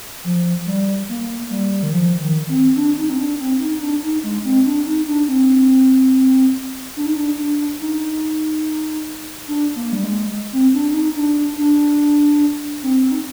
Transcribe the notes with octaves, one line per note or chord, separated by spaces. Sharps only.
F3
G3
A#3
G3
D#3
F3
D#3
C4
D4
D#4
C4
D4
C4
D#4
D4
D#4
G#3
C4
D4
D#4
D4
C4
D4
D#4
D4
D4
D#4
D4
A#3
G3
G#3
C4
D4
D4
D#4
D4
D4
C4
D#4